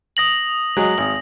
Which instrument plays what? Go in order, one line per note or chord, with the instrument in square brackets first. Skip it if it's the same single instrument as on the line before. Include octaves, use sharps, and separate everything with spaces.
[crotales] D#6 A#6 F#7
[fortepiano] F#3 G#3
[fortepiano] G#1 [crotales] F#7